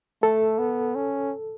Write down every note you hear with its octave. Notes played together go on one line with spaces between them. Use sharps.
A3 A4
B3
C#4